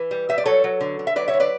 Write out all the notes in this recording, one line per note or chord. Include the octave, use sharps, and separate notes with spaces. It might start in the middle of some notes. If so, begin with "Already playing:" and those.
Already playing: E3 B4
G3
G3 E5
D5
F#3 A4 C#5
F#3
D3
D3
E5
F#3 B4 D5
C#5 E5
D3
B4 D5